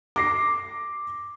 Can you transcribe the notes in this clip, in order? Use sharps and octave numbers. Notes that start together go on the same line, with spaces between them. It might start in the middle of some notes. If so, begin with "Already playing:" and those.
D6 A#6 C7